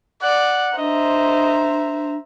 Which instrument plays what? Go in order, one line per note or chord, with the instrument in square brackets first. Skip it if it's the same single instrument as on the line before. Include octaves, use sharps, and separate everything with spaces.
[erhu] D5 [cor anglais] F#5
[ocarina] D4 [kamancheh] C5 E5 [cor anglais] D#5 [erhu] A#5